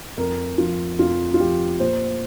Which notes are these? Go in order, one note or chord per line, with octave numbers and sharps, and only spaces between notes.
F2 A#4
F3 F4
F2 F4
F4
F3 G4
A#2 C5